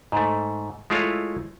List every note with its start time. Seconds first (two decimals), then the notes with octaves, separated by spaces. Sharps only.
0.12 G#2 A3
0.90 G#3 A3 E4 F4 G#4 C#5